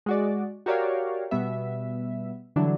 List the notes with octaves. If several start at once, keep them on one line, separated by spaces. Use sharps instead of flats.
G#3 F#4 D5
F#4 G4 A#4 C#5 D5 F5
B2 G3 B3 E5
D3 E3 F#3 G3 D4